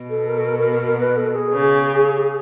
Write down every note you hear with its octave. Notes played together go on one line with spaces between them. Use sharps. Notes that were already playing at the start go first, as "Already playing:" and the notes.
Already playing: B2
A4
A#4
A4
A#4
A#4
A#4
A#4
B4
A4
G#4
C#3